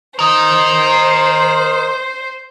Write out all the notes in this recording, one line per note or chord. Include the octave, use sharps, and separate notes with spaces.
A#4 C5 D#5